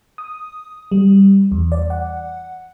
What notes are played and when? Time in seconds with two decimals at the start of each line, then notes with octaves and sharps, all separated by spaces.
0.18 D#6
0.91 G3
1.52 E2
1.72 D5
1.90 F#5